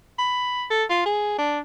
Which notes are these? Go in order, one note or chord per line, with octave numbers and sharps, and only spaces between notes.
B5
A4
F4
G#4
D4